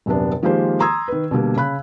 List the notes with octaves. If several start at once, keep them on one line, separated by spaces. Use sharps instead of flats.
D#1 F#2 C3 B3 D4
D#3 F3 G#3 A#3 G4 C5
A#5 C6 D#6 E6 G#6
D#3 B4
B2 D3 G3 A#3
C#3 B5 F#6